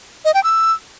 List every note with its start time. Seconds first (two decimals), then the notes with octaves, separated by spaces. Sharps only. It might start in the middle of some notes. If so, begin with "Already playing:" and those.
0.25 D#5
0.34 G5
0.44 E6